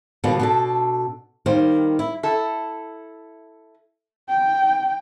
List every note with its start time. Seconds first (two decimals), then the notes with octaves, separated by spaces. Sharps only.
0.24 B2 D3 F3 G3 A#3 B3
0.39 B2 D4 A4
1.46 D#3 G3 A#3 C5
1.99 E4
2.23 E4 A4
4.28 G5